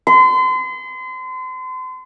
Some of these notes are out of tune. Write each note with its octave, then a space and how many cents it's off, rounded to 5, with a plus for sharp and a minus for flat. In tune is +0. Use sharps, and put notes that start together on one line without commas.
C6 -35